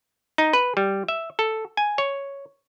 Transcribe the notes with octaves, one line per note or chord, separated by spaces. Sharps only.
D#4
B4
G3
E5
A4
G#5
C#5